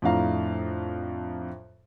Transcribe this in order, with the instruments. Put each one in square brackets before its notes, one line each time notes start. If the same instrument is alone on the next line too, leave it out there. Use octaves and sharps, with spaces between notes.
[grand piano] F2 A2 D4 F5 A#5